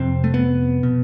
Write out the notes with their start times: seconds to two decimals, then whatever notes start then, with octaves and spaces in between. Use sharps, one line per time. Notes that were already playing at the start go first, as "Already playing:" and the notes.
Already playing: F2 C3 C4
0.24 A3
0.34 B3
0.83 B2